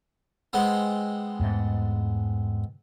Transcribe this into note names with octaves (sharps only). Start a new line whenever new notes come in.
G#3 B3 C4
E2 G#2 A3